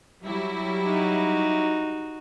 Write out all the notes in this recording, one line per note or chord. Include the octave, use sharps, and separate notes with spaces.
F#3 G3 E4
D#4 F#4